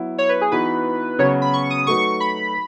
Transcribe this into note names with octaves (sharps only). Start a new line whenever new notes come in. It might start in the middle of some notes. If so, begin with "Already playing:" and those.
Already playing: F#3 B3 E4
C#5
B4
G#4
E3 B3 D#4 F#4 B4
C#3 F#3 B3 F#4 C#5
B5
C#6
D#6
F#3 A3 D#4 F#4 B4 C#6
B5